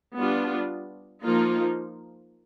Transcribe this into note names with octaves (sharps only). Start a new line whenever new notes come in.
G3 B3 D4 F4
F3 A#3 D#4 F4